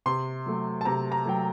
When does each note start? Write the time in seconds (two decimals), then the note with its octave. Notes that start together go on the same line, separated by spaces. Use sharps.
0.06 C3 C6
0.46 F#3 A3
0.81 A5
0.85 C3 A#5
1.12 A#5
1.25 F#3 A3 G5